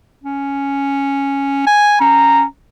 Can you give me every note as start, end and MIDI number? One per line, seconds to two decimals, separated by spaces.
0.24 1.65 61
1.67 2.00 80
2.00 2.45 61
2.00 2.45 82